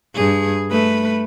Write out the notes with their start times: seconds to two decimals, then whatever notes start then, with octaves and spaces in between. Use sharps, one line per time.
0.15 G2 G#4
0.71 A3 B4